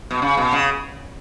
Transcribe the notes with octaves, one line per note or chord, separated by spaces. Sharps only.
B2
C#3
B2
C#3